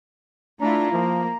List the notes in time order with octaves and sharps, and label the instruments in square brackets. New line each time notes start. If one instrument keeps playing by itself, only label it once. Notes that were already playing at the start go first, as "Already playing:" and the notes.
[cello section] A3 E4 F4 [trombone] D4 [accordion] A#5
[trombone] F3 [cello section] A#3